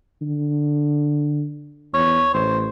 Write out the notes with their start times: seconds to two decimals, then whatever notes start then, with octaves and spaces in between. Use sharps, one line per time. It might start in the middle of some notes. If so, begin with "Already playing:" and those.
0.22 D3
1.94 E2 C#5
2.34 A1 C5